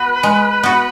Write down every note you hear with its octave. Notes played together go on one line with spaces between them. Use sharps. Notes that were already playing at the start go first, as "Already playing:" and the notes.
Already playing: B3 F#4 B4
G#3
B3 F#4